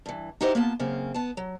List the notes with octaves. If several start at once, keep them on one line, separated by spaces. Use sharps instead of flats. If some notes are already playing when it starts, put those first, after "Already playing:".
G2 E3
D#4 E4 F#4 G4 C5 D#5
A#3 B3 F4 A5
F#2 C#3 A#3 C4
B3 A5
F#3